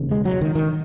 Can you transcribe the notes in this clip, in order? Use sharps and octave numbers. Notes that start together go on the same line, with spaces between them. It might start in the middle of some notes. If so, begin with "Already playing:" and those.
Already playing: E1 D#2 C#3
G#3
F#3
D#3
D#3